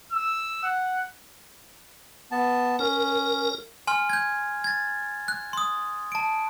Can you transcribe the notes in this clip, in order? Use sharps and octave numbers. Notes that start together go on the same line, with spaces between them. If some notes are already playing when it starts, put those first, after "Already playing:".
E6
F#5
B3 A5
C#4 A#4
G#5 C6 F6
G6 G#6
G#6 A6
F#6
C6 D#6
A5 D7